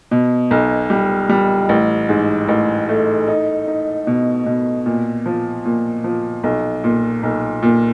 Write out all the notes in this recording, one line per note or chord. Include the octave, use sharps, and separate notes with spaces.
B2
B1
G3
G3
A1
G#2
A1
A3
D#4
D#4
B2
B2
A#2
F3
A#2
F3
B1
A#2
B1
A#2